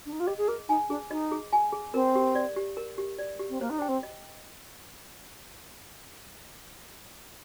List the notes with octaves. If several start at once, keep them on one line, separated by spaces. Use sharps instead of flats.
D4
D#4
F4
G4 D#5
G#4
G#4 A#4
D#4 G#5
D4 G#4
D#4 D#5
G#4
G#5
G#4
C4 A#4
G4
D5
G4
A#4
G4
D5
G4
C4
A#3 C5
D#4
D4 G5
C4
D#5